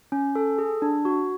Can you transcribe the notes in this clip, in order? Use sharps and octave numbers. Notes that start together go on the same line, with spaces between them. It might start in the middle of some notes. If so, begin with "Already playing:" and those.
C#4
A4
G#4
D4
F#4